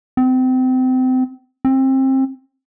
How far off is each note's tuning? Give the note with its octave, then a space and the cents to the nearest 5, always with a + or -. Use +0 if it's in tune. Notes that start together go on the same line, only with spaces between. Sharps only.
C4 -30
C4 +25